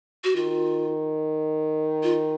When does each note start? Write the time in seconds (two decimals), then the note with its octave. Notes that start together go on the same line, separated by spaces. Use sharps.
0.24 F#4
0.36 D#3 F4
2.03 F4